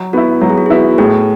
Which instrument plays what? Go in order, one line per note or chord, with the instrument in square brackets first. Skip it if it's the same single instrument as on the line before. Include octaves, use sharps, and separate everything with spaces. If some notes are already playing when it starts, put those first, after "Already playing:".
Already playing: [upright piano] F#3
[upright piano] B3 E4 [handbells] F#4
[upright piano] F#3 [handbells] F#4
[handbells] G#4
F#4
G#4
[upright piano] B3 E4 [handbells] F#4
[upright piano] A2 [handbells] G#4